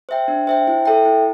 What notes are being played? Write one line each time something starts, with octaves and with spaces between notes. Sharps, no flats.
C5 E5 G5
D4
C5 E5 G5
E4
A4 E5 G5
E4